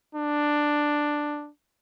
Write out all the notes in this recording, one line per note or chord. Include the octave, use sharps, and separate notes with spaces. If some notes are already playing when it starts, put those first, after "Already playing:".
D4